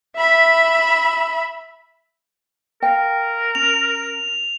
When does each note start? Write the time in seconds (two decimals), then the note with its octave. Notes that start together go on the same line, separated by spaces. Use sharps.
0.16 E5 B5
2.83 A#4 F5 G5
3.55 C#4 F7